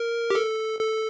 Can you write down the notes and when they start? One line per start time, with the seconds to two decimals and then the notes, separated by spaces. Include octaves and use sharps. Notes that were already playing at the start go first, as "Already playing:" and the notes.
Already playing: A#4
0.30 G4
0.35 A4
0.79 A4